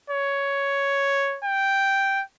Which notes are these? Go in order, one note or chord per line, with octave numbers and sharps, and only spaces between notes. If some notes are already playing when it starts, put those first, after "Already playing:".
C#5
G5